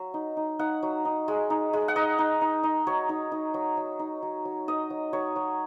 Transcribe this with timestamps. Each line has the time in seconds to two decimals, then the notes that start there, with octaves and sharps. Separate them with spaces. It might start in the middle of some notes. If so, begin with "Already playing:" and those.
Already playing: F#3
0.14 D#4
0.37 D#4
0.59 D#4 F#5
0.83 F#3
1.05 D#4
1.28 G#3
1.50 D#4
1.73 G#3
1.88 F#5
1.96 D#4 D#5
2.19 D#4
2.41 D#4
2.64 D#4
2.87 F#3 C#5
3.09 D#4
3.32 D#4
3.54 F#3
3.77 F#3
3.99 D#4
4.23 F#3
4.45 F#3
4.68 D#4 D#5
4.90 F#3
5.13 F#3 C#5
5.36 F#3